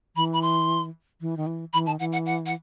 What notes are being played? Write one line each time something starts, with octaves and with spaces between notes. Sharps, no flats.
E3 B5
B5
C6
E3
D#3
E3
E3 B5
D#3 A5
E3 F#5
F#5
F#5
F#5